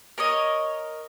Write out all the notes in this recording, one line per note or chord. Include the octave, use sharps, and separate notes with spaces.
A#4 C#5 D#5